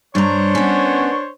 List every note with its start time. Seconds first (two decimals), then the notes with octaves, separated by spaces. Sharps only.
0.15 G2 D4 C5 C#5 A#5
0.55 B3 C#4